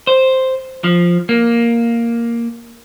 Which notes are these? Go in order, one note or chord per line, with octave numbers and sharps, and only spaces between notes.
C5
F3
A#3